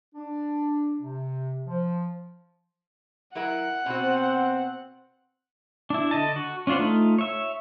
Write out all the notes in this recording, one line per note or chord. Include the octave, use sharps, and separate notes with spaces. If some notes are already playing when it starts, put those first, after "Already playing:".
D4
C3
F3
F#3 E4 A#4 F#5
B2 C4 F#4
D4 E4
D3 D#5 A5
F#4
C#4 D4 F4 C5 F#5
A3 D#4 F4
C#5 E5